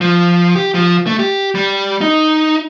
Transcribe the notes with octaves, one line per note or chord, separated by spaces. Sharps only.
F3
G4
F3
A3
G4
G3
D#4